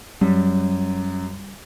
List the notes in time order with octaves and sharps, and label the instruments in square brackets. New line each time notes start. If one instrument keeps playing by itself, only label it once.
[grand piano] F#2 [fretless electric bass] G3